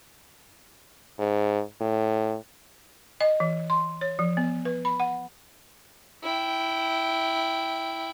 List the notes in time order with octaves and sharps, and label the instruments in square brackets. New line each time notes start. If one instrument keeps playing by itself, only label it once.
[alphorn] G#2
A2
[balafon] D#5
E3
C6
C#5
F3
B3
B4
B5
F#5
[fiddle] E4 G5